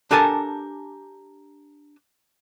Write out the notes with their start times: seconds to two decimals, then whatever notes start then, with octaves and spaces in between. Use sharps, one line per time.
0.11 D4 G4 A4 A#4 G#5 A5